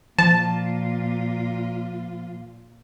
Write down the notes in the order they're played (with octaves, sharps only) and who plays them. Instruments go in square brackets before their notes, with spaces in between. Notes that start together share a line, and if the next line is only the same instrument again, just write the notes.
[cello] A#2 F4 [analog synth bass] F3 [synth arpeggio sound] A5